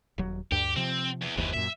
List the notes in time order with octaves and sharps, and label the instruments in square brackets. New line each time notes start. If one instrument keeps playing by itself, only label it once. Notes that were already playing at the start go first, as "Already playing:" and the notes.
[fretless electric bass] D#1 F#3
[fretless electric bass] D2 G2 [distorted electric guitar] G4
[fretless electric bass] C3 F3 [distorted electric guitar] C4
[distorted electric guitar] E2
[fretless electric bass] F#1 D#2 [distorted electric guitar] G#2 E3
[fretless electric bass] F#2 A#2 [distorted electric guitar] E5